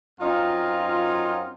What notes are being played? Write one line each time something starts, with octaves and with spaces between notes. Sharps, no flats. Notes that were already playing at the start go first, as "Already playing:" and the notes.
F#2 C4 D#4 F4